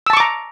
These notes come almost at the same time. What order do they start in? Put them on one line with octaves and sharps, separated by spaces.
E6 A5 C#6 D6 A#5